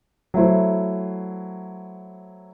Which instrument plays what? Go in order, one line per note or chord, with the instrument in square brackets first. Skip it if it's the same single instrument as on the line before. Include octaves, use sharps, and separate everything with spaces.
[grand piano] F#3 A3 E4 C5